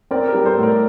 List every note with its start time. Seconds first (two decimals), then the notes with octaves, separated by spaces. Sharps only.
0.11 C4 A#4 D5
0.28 G4 A#4
0.34 G3
0.45 A4 C5
0.57 A2
0.63 A#4 D5